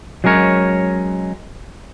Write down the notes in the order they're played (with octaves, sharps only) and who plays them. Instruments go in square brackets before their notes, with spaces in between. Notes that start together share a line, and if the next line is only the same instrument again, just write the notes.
[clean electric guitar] F#3 G#3 C#4 A#4 C#5